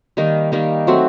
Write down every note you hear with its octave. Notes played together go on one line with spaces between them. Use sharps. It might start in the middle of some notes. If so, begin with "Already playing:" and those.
D#3 G3 A#3 D#4
D#3 G3 A#3 D#4
F#3 A3 C4 F#4